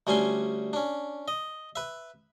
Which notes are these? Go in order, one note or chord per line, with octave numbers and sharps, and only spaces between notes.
D2 G3 C#4 D4 G#5 C6
C#4 D4
D#5
B4 E5